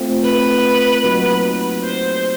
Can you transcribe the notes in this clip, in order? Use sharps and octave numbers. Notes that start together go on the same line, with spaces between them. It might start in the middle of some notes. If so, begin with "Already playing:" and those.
Already playing: A3 C4 F4
B4
F#3 A#3 D#4 F#4
C5